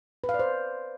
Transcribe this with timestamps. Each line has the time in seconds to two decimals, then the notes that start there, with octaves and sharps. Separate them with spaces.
0.24 B4
0.29 F5
0.34 D5
0.39 C5